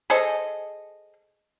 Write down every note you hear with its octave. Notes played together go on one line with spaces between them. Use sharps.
G#4 A4 C5 D#5